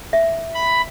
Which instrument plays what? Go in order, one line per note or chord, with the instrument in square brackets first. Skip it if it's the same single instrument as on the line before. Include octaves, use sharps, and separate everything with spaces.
[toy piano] E5
[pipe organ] B5